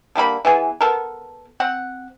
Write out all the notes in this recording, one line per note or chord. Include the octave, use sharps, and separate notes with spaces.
D3 G3 A#3 B5
E3 B3 G#4
B3 A4 A#4
C4 F#5